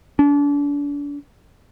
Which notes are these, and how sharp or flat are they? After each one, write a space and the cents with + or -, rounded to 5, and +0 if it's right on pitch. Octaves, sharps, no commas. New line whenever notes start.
D4 -35